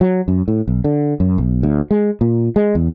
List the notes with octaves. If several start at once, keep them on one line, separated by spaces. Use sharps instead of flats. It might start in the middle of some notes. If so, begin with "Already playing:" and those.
F#3
F#2
A2
B1
D3
F#2
B1
D2
G#3
A#2
G#3
E2